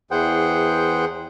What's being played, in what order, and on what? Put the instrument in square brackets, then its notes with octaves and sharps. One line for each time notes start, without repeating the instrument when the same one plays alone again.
[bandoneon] E2 E3 G#4 C5 F#5 G5